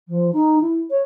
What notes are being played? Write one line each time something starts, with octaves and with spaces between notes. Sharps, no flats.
F3
D#4
E4
C#5